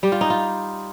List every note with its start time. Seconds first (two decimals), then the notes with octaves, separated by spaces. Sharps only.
0.03 G3 G4
0.12 F4
0.21 D#4
0.30 F4